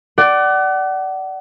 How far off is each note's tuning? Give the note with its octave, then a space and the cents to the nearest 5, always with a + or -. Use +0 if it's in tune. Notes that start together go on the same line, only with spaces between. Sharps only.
D5 +0 F#5 +35